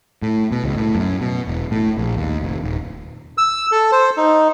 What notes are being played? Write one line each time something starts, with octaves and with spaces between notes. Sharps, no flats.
A2
B2
C#2
A2
F#2
B2
E1
A2
A#1
D#2
F1
D#1
E6
A4
C5
D#4